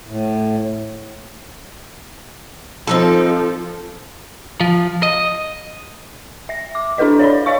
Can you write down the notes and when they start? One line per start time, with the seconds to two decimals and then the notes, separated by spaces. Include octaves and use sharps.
0.05 A2
2.87 F3 C4 D#4 A4
4.60 F3
5.03 D#5
6.49 E5 A#6
6.75 D6
6.98 D4 E4 A4 B4 D#5
7.19 C#5 D5 B5
7.46 C#5 D#5 F5 C#6